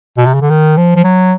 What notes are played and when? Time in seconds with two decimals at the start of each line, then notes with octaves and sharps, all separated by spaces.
0.17 B2
0.26 C3
0.34 C#3
0.41 D3
0.50 D#3
0.77 F3
0.96 F3
1.04 F#3